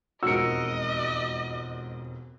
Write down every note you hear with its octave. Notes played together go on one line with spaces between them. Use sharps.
E1 F2 G#2 F#4 A#4 D#5 E6 C#7